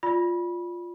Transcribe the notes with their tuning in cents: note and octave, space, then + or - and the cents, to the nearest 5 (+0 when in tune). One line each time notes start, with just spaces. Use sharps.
F4 +0 D5 +0 B5 -20